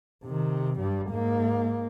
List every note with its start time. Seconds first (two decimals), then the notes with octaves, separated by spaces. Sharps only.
0.24 C3 D#3
0.79 G2 G3
1.10 G#2 A#3